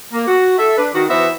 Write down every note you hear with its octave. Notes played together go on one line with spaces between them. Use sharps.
A#3
F#4
A4 E5
D4 B4
D#3 F#4
E3 B3 F#4 C5 E5